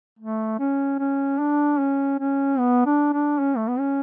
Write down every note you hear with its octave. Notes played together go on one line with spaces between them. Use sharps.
A3
C#4
C#4
D4
C#4
C#4
B3
D4
D4
C#4
A3
B3
C#4